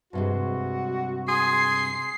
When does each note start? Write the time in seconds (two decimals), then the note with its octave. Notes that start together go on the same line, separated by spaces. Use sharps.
0.13 G2 C3 G#3 F#4
1.28 G#4 C6 C7